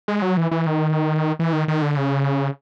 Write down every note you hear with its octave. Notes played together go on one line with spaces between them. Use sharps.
G#3
F#3
E3
E3
D#3
E3
D#3
D#3
D3
C#3